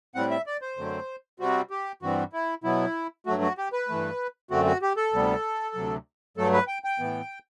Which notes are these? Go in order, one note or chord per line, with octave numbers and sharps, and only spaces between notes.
A2 G3 C4 F#5
E5
D5
C5
F#2 D3 F#3 A3 C4
C3 G3 C4 F#4
G4
G2 E3 G3 C4 F#4
E4
B2 F#3 B3 E4
G2 F#3 A3 F#4
F#4
G4
B4
G2 E3 A3
F#2 D3 A3 C4 F#4
F#4
G4
A4
D2 C3 G3 B3
D2 C3 F#3
G2 F#3 A3 A4
B4
G5
G5
A2 E3 B3